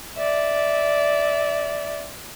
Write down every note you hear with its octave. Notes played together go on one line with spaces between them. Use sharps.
D5 E5